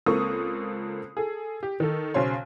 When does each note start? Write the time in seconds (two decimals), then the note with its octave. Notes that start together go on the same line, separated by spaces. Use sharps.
0.06 C#2 A#3 C4 A4 C#6 D#6
1.17 G#4 A4
1.63 G4
1.80 D#3 A4
2.14 B1 C#3 C5 C#5 C6